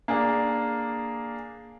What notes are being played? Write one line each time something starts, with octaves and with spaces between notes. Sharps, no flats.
A#3 D4 G#4